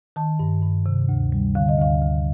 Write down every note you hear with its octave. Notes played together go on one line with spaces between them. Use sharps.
D#3 A5
G2
G2
C3
D2
G3
D3 F5
D#5
D2 F5
D2